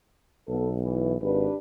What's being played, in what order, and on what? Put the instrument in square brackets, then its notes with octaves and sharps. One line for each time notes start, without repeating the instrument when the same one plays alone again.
[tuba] B1 [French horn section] B3 A4
[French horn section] E3
[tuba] G#1 [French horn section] D4 G4 B4